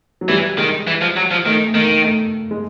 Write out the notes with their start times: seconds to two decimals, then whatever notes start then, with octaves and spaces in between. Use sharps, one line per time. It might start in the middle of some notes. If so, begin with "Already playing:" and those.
0.21 F#3
0.29 E3 G3
0.58 D#3 G#3
0.87 E3
1.01 F3
1.16 F#3
1.31 F3
1.45 D#3 A3
1.67 A3
1.75 D#3 A#3
2.04 A3
2.51 G#3